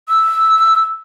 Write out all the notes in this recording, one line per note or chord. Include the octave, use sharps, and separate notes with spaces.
E6